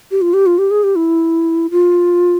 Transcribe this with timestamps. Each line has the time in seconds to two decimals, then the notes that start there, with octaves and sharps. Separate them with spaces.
0.11 G4
0.21 F4
0.34 G4
0.46 F4
0.58 G4
0.71 G#4
0.84 G4
0.96 E4
1.71 F4